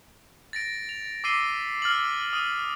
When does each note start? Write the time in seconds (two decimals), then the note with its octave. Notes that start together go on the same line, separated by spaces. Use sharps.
0.53 A6 A#6 D7
0.89 F7
1.24 D6 E6 B6 C7 D#7 G7
1.82 E6 F6 A6 C7 F#7
2.33 D#6 E6 D#7